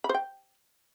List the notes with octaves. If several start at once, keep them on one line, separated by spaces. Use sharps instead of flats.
B5
C5
G5